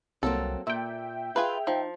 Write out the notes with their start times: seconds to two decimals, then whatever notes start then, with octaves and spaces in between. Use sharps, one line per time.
0.23 C2 F#3 A#3 C4 A4
0.67 A#2 E5 G5
1.36 F4 G#4 B4 G#5
1.67 F3 D#4